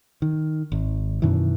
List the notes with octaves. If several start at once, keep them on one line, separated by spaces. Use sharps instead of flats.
D#3
G#1
F#2 B2 D#3 E3